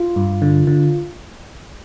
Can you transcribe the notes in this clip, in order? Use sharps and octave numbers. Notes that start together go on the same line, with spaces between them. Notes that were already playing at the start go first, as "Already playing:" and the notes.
Already playing: F4
G2
D3
D3